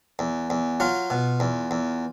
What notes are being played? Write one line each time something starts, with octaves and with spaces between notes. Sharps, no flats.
E2
E2
F#3 F4
B2
E2
E2